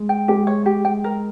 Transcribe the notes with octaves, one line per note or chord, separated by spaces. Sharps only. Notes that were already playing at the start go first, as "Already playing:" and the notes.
Already playing: G#3
G5
G#3 G4
C#5
G4
G5
A#4